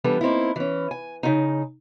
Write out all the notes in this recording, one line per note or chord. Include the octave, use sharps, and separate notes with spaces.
E3 G3 B3 D4 A4
A#3 C4 D#4 E4
E3 C#4
G#5
C#3 D#4